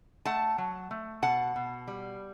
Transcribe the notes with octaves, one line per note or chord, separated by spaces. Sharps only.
A3 F#5 A5
F#3
A3
B2 F#5 A5
B2
G3